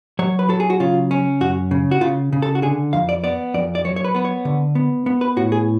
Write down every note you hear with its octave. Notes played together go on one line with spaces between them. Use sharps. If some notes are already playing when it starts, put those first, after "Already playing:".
F#3 C#5
B4
F#3 A4
G#4
F#4
C#3 F4
C#4
F#2 F#4
C#3
F#4
C#3 F4
C#3
A4
F#4
D3 G#4
F2 F5
D5
B3 D5
F2 D5
D5
F#3 C#5
C#5
B4
B3 B4
C#5
D3
B3
B3
B4
A2 F#4
G#4